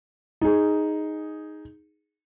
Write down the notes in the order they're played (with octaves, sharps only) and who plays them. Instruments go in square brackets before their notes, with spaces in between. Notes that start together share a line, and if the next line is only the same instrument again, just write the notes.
[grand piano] D#4 G#4